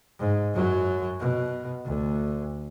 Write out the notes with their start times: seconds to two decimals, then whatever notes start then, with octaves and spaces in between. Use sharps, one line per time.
0.19 G#2
0.54 F#2 F#3
1.19 B2
1.84 D2